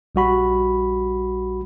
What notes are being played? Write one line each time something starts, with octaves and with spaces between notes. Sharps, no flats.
A#1 G3 F#4 B5